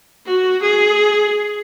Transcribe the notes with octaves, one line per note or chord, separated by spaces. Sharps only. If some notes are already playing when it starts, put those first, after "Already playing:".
F#4
G#4